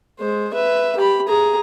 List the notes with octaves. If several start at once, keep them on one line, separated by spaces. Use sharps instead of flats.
G#3 C5
B4 E5
G4 B5
G#4 A#5